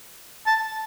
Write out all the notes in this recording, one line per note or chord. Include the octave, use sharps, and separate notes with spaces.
A5